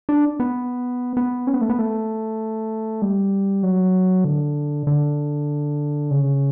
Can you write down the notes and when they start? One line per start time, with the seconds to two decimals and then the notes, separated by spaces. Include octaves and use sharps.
0.09 D4
0.40 B3
1.17 B3
1.47 C#4
1.54 B3
1.61 A3
1.69 B3
1.79 A3
3.02 G3
3.63 F#3
4.24 D3
4.87 D3
6.11 C#3